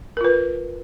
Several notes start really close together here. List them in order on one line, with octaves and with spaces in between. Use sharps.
A#4 F4 B4